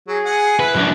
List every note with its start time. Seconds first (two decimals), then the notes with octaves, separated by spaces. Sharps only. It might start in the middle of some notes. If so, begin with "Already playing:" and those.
0.08 F#3 G#4
0.25 F#5 G#5
0.60 E4 B4 F#6
0.75 F#2 D4